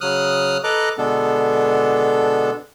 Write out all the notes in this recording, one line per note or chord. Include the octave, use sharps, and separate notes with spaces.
C#3 F#3 D#6 F6 F#6
A4 B4 D#5 A#5 D6 F#6
B2 D3 G#3 B3 D4 A4